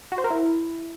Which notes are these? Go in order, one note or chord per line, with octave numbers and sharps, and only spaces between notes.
F#4
C5
A#4
E4